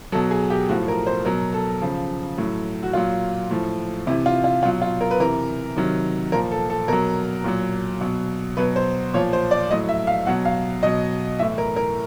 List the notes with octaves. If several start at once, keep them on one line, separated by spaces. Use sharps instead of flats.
B2 F#3 A4
G#4
G4
A2 F3 F#4
A#4
C5
B2 F#3 A#4
A4
C#3 F3
A2 F#3
F#4
A#2 F#3 F4
A2 F3
C3 E3 E4
F4
F4
B2 F#3 F4
F4
A#4
B4
C3 E3 A#4
C3 D#3 F#3
A#2 F3 A#4
A4
A4
B2 F#3 A#4
A#2 F#3
B2 F#3
B2 F#3 B4
C5
A#2 F3 C#5
C5
D5
A2 F#3 D#5
E5
F5
B2 F#3 F#5
F5
B2 F#3 D#5
A2 E3 E5
A#4
A#4